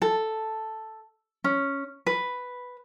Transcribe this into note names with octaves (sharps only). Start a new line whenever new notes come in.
A4
C#4
B4